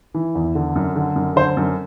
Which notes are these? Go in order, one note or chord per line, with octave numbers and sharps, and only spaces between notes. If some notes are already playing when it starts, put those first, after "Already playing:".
E3
E2
D3
F#2
D3
F#2
D3 C5
F#2